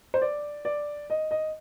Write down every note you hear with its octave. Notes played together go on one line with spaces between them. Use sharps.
C5
D5
D5
D#5
D#5